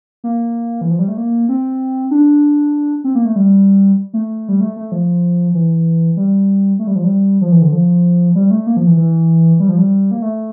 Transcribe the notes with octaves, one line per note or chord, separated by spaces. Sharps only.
A#3
E3
F3
G3
A3
A#3
C4
D4
C4
A#3
A3
G3
A3
G3
A3
A3
F3
E3
G3
A3
G3
F3
G3
F3
E3
D3
F3
G3
A3
A#3
F3
E3
E3
G3
F3
G3
A#3
A3